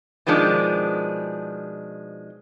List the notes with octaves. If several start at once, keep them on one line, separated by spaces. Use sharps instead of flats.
B2 D#3 F3 G#3 D4